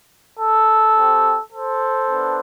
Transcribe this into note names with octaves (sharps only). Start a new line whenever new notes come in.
A4
C4 G4
A4 C5
B3 D4